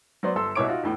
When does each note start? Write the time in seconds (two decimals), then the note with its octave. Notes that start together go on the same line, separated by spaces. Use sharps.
0.23 F#3 B3 C5 D5 C6
0.36 G1 A4 C6 E6
0.55 C2 B2 E4 C#5 D6 D7
0.68 D#4 F4 F#4
0.83 E2 A2